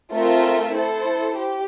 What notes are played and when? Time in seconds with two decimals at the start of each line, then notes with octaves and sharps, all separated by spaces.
0.12 A3 C4 F4 A#4 E5
0.75 E4 A4 C5
1.38 G4